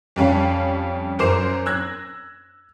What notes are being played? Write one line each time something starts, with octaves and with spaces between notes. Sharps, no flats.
F2 G3 C#4 F5
F#2 A#4 C5 D6 C7 E7
E6 F#6 G#6 A#6